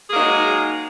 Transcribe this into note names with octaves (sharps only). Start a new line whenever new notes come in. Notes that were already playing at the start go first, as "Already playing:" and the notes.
F#3 G#3 A#3 D#4 G#4